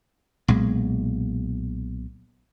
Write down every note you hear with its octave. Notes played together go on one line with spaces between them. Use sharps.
B1 A#2 G#3